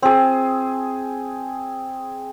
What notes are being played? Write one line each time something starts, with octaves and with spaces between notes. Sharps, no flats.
C4 G#4